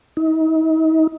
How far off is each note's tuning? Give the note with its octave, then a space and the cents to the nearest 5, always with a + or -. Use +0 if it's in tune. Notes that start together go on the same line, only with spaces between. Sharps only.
D#4 +40